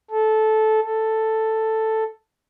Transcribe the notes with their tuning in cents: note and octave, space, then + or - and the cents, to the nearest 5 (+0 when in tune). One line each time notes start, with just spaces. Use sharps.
A4 -15
A4 +5